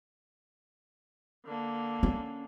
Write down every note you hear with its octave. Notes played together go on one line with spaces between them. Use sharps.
D3 A#3
C#4